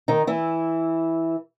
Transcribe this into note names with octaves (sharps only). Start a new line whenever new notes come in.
D#3 D#4
E3 E4